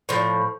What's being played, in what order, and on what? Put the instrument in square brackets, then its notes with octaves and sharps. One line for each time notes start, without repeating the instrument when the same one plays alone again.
[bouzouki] A2 F3